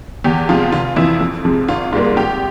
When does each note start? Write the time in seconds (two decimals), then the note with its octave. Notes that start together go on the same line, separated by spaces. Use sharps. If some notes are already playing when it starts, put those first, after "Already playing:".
0.24 E2 G4
0.49 C3 F3 G#3 F4
0.72 F1 F4
0.96 F2 E3 E4
1.20 F2
1.45 C3 F3 G#3
1.68 G#1 F4
1.93 G#2 G3 A#3 F4
2.16 G#1 G4